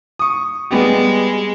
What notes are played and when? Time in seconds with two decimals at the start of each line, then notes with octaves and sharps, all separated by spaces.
0.19 C#6 D#6
0.71 G3 G#3 B3 G4